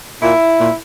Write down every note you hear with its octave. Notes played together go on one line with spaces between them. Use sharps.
A#2 E4
A#2